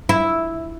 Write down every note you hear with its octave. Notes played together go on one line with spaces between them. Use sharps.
E4